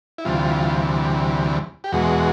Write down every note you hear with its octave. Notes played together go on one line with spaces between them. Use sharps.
E4
D2 C3 E3 G3 F4
G4
E2 B2 G#3 F#4